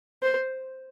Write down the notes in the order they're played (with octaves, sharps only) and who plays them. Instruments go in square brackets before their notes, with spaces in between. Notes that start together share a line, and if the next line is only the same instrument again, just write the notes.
[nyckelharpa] C5